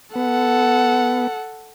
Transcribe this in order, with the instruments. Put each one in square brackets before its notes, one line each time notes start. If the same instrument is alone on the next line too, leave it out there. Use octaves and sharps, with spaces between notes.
[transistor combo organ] B3 [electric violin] A4 F#5